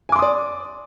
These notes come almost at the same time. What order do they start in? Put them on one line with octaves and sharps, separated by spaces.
G#5 D6 C6 D#6 D5